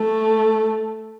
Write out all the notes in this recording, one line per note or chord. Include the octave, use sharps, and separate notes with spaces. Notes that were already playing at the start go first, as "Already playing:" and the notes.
Already playing: A3